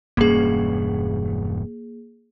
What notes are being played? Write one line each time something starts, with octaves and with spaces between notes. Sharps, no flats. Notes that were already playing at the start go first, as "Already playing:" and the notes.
E1 G2 A#3 C#4 G#4